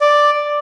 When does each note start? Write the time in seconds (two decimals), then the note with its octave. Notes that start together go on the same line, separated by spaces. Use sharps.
0.01 D5